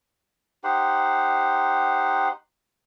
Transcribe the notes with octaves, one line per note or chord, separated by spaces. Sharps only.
D#4 G4 C5 F#5